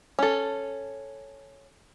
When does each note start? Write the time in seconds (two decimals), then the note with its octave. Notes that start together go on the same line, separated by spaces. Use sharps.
0.19 C#4 A4